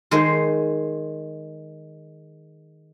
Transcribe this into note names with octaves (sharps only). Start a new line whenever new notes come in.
D#3 G#3 C5 D#5